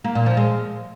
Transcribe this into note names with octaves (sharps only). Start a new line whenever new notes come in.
A#3
A#2
F3
G#3